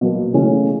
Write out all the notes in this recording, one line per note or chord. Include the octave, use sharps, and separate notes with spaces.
B2 F#3 A#3
C#3 E3 A3 C#4